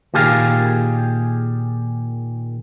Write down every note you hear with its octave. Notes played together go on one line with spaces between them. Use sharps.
A#2 D#3 G4 G#4 F5